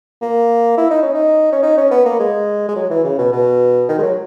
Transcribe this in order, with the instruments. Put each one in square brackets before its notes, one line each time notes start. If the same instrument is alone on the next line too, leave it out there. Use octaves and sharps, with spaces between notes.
[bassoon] A#3
E4
D#4
C#4
D#4
C#4
D#4
C#4
B3
A#3
G#3
G#3
F#3
E3
C#3
B2
B2
D#3
G#3
F#3